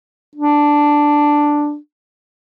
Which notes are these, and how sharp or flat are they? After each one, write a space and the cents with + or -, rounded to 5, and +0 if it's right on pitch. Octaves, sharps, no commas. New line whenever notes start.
D4 +0